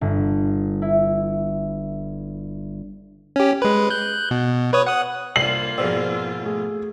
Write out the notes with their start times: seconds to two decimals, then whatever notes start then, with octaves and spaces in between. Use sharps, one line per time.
0.01 G1
0.82 E4
3.36 C#4 G4
3.62 G#3 B4
3.90 F#6 G6
4.31 B2
4.73 B4 C#5 D#6
4.87 F#5 D#6 F#6
5.36 C2 D3 A#3 F4 C7 F#7
5.78 F2 G#2 B2 C5 D5 E6
6.45 A3 G#4